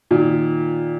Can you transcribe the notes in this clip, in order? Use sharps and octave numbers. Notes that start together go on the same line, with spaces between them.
A#2 D#3